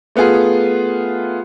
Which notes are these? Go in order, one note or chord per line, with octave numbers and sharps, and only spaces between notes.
A3 B3 F4 G#4